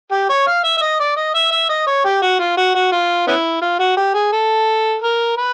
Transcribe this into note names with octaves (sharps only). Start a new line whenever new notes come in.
G4
C#5
F5
E5
E5
D#5
D5
D#5
E5
E5
D#5
C#5
G4
F#4
F4
F#4
F#4
F4
B3 C#4 E4
F4
F#4
G4
G#4
A4
A#4
B4